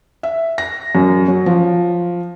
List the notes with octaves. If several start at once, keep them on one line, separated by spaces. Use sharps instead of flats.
E5
A#6
F#2
F#3
F3